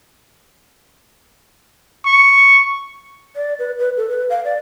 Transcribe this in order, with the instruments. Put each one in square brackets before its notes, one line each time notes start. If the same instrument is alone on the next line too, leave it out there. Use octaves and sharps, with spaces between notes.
[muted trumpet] C#6
[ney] D5
B4
B4
A4
B4
F5
D5